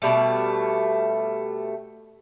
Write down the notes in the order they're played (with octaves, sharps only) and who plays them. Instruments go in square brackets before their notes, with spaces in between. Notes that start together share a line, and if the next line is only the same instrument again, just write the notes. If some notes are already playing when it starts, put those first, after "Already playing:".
[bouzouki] B2 G3 A3